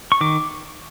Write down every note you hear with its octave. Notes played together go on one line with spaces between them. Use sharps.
C#6
D#3 D6